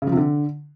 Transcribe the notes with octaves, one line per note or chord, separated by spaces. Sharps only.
C#3
F3
C3
D3